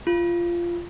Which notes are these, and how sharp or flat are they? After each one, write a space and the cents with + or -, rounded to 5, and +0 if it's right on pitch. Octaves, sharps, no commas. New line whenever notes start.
F4 -15